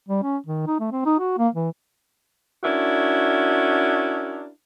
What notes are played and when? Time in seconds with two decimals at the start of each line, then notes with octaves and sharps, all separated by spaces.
0.09 G3
0.23 C#4
0.46 D#3
0.66 D#4
0.80 A3
0.92 C4
1.05 D#4
1.19 F#4
1.38 A#3
1.54 E3
2.64 C#4 D4 E4 F#4 A#4